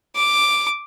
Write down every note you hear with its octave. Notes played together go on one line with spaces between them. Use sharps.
D6